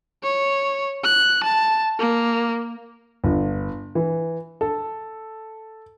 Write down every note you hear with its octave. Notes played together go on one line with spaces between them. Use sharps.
C#5
F#6
A5
A#3
G1
E3
A4